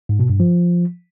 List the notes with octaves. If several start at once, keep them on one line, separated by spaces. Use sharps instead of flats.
G#2
B2
G2
F3